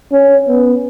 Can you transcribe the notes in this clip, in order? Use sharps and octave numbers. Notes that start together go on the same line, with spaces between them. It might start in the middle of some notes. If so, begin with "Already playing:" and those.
C#4
B3